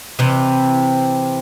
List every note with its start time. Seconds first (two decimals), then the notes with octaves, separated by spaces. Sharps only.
0.19 C3 E3